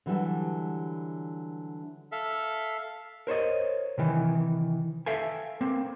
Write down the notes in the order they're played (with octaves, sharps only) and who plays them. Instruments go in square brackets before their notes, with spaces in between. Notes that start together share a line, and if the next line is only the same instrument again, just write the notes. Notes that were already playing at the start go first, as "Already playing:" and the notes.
[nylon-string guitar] D3 E3 F#3 G3 A5
[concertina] A4 E5 F5
[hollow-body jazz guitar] A#4 C5 C#5 D#5
C3 D#3 E3
A4 E5 F5 G5 G#5
A#3 C4